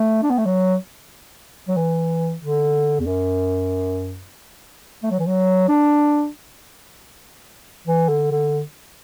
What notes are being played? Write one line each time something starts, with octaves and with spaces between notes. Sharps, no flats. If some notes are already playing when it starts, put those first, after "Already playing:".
Already playing: A3
D4
B3
A3
F#3
F#3
E3
D3
E2
F#2
A3
F#3
E3
F#3
D4
E3
D3
D3